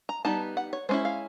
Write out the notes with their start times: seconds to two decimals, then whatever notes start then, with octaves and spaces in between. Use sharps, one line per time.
0.09 A#5
0.25 G3 B3 D#4 A5
0.57 F#5
0.73 C#5
0.89 G#3 C#4 E4 C5
1.05 F5